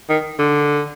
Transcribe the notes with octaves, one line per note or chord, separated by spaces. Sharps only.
D#3
D3